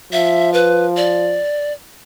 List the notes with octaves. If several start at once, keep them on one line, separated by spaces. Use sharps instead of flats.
F3 E5
B4
D5